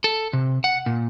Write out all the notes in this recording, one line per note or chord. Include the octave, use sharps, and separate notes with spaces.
A4
C3
F#5
A#2